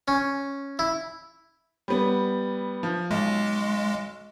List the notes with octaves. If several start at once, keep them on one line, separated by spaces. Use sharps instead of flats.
C#4
E4
G3 B3
F3
B1 G#3